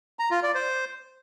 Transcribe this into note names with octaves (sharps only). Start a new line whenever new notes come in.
A#5
F4
D5
C5